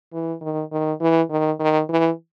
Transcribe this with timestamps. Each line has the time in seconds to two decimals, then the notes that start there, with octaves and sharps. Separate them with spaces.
0.13 E3
0.41 D#3
0.72 D#3
1.01 E3
1.30 D#3
1.60 D#3
1.89 E3